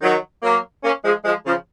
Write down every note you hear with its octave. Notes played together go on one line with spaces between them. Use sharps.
D#3 F#3
F#3 A#3
A#3 C#4
F3 G#3
F3 G#3
C#3 F3